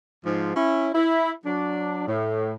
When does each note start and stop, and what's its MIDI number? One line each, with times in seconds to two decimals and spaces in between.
0.25 0.55 44
0.25 0.55 53
0.55 0.90 61
0.55 0.90 64
0.94 1.31 64
1.45 2.03 54
1.45 2.03 62
2.07 2.53 45